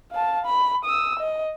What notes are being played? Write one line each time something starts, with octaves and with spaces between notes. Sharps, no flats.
F5 A5
B5
D#6 E6
D#5